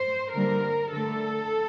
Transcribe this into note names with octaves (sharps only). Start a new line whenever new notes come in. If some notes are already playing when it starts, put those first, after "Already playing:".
Already playing: C5
D3 G3 A#3 A#4
D3 A3 A4